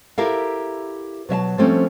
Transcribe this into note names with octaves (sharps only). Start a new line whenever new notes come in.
E4 G4 A4 A#4 E5 F5
B2 F#3 E5 A5
F3 G3 A3 C4 C#4